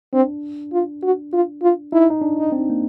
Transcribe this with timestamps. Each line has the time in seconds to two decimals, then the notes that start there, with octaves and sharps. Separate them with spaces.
0.13 C4 D4
0.73 F4
1.03 F#4
1.33 F4
1.63 F4
1.93 D#4 E4
2.10 D#4
2.22 D4
2.38 D#4
2.52 C4
2.70 A#3